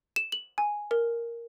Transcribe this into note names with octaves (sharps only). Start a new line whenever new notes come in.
E7
F#7
G#5
A#4